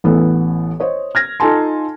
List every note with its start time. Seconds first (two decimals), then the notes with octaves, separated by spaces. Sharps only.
0.04 A1 E3 B3 A4
0.80 C5 C#5 D#5
1.15 F6 G#6 A#6
1.40 D#4 F4 A4 G#5 A5 C6